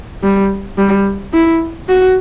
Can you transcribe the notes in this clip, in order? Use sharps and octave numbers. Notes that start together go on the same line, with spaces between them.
G3
G3
E4
F#4